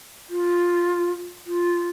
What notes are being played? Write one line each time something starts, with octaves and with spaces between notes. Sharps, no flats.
F4
F4